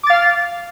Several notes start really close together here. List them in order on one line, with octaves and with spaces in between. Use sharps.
D6 A6 F5 F6